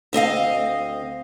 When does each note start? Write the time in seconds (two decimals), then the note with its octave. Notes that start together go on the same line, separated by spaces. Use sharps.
0.13 D2 C4 D#5 F5